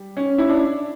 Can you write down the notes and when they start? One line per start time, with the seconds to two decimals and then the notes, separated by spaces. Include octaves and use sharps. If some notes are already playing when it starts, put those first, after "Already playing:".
Already playing: G3
0.17 C#4
0.38 E4
0.49 D4